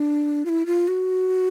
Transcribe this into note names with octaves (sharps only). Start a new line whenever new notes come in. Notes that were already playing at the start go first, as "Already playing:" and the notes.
Already playing: D4
F4
E4
F4
F#4